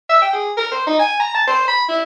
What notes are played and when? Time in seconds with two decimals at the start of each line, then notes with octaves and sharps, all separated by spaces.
0.10 E5
0.22 G5
0.33 G#4
0.57 A#4
0.72 C5
0.87 D#4
1.00 G#5
1.20 A#5
1.35 A5
1.47 C5
1.68 B5
1.89 E4